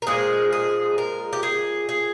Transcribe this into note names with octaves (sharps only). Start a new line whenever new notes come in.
A#4
A#2 F3 G#3 G#4
G#4
A#4
G4
G#4
G#4